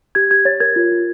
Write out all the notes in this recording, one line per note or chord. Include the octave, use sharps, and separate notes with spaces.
G4 G#6
G4 G#6
C#5 A6
A#4 G#6
F4
F4